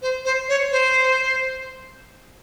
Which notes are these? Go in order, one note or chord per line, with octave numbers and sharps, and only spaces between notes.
C5
C5
C#5
C5